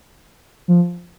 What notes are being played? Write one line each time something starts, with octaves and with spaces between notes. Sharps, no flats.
F3